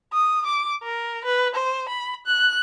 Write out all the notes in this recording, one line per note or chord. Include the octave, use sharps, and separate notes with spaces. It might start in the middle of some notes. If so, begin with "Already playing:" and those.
D#6
D6
A#4
B4
C5
B5
F#6